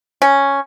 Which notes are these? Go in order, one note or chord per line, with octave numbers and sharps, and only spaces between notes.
C#4